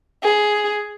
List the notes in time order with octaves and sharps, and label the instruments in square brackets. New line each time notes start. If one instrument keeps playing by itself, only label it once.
[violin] G#4